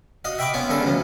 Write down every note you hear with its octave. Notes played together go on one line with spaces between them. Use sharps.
F#4 D#5 F5
E5 F#5 G5 B5 C#6 D6
B3 C#4 F4 F#4
E2 D3 C#4 A4 A#5
D2 F3